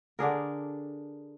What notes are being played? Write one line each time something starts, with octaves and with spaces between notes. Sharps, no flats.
D3 D4 G#4 A#4